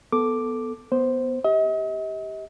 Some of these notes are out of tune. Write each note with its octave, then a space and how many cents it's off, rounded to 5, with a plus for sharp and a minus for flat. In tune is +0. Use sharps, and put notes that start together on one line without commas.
B3 +0 A4 +0 D6 +0
B3 +0 C5 +0
G4 +0 D#5 +40